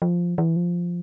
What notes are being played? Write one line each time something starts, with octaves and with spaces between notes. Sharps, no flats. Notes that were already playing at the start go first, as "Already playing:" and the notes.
F3
E3
F3